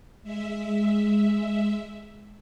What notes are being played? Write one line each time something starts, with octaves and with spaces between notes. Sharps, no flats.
G#3 E5